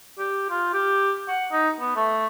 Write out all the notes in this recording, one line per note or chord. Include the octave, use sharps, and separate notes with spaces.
G4
F4
G4
F#5
D#4
B3
A3